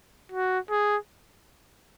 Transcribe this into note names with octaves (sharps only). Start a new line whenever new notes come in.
F#4
G#4